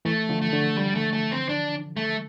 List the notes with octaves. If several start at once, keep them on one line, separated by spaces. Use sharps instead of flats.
E3 A3
D3 F3
A3
D3
G3
A3
A3
C4
D4
A3